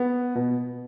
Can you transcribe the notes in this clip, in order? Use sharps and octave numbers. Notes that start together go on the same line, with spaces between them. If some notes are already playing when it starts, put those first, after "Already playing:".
Already playing: B3
B2